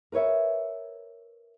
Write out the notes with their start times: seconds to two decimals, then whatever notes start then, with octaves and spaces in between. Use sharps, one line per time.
0.12 A#4 B4 C#5 E5